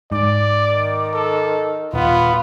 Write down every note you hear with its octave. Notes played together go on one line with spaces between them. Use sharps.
G#2 D5 D6
D#3
A4
D#1 B3 F4 B5